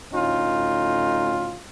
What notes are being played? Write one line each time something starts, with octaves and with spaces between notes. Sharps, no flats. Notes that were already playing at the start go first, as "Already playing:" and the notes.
D2 A2 C#4 D#4 F4